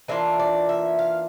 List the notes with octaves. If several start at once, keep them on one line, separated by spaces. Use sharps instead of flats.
E3 A#3 D4 F4 E5
D5
E5
F5